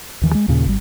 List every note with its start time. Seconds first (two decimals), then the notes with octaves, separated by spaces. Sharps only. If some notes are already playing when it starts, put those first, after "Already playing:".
0.22 D#2 D#3 E3
0.35 G#3
0.48 D#2 A#2 C#3
0.66 G#1 G3